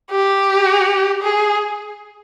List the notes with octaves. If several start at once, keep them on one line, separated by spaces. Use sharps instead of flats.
G4
G#4